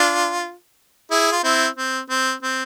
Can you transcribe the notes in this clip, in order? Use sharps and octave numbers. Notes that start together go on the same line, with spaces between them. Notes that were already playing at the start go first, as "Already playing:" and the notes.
Already playing: D4 F4
E4 G#4
F4
C4 E4
C4
C4
C4